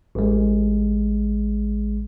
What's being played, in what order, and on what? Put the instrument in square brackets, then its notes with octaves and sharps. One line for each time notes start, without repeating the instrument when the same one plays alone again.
[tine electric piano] A1 G#3